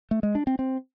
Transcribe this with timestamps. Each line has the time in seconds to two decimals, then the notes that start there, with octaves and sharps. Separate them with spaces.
0.11 A3
0.23 G#3
0.35 D4
0.47 C4
0.59 C4